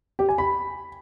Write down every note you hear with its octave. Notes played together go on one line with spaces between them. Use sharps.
G4
G#5
B5